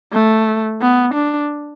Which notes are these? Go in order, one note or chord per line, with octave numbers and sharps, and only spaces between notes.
A3
B3
D4